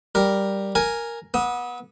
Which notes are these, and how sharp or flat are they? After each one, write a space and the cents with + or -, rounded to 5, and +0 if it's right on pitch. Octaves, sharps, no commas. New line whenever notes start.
G3 +0 A#4 +0
A#4 +0 G#5 +0
B3 -25 D#6 +40